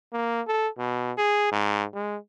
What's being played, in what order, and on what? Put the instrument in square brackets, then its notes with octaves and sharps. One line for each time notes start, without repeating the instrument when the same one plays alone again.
[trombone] A#3
A4
B2
G#4
G#2
G#3